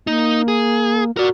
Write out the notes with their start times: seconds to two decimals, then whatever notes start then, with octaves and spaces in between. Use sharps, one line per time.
0.07 A#3 D#4
0.48 G#4
1.17 F#4 A#4 D5